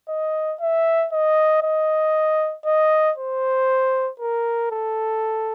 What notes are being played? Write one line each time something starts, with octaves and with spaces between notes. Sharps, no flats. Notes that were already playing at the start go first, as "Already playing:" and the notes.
D#5
E5
D#5
D#5
D#5
C5
A#4
A4